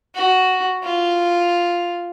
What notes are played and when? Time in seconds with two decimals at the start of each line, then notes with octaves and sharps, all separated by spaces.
0.15 F#4
0.83 F4